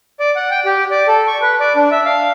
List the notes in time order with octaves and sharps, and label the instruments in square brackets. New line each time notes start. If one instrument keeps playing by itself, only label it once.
[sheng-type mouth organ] D5
F#5
G5
G4
D5
A4
C#6
B4
D5
D4
E5
F5